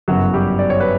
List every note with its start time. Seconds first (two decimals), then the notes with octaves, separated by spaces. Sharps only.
0.08 G1 F#2 C#3 E3 F#3 F#4
0.34 G3 G4
0.59 D5
0.70 C#5
0.80 B4